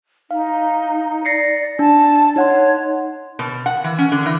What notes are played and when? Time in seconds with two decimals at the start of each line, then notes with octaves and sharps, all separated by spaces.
0.31 D#4 F5
1.25 D5 A#6 C7 C#7
1.79 D4 A5
2.36 D#4 C#5 F#5 C6
3.39 B2
3.66 F#5
3.84 E3
3.98 C#4
4.12 D3
4.26 E3